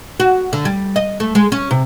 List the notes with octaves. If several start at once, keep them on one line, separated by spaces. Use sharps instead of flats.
F#4
D3
G3
D#5
A3
G#3
C#4
C3